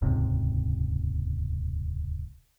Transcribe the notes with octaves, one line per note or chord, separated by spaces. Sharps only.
D#1 C#2 G#2 C3